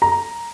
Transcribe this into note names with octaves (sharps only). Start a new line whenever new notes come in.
A#5